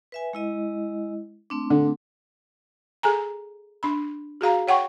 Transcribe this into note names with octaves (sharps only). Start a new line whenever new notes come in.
B4 E5 G#5
G#3 E4 D#5
A3 C4 D4
D3
G#4 A4 G#5 A#5
D4 B5
F#4 G#4 F5 A#5
C#5 F#5 G5 C#6